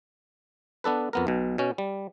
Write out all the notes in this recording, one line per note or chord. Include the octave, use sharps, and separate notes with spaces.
B3 D4 A4 B4
F2 B3 A#4
B1 B2
B2 C#4
G3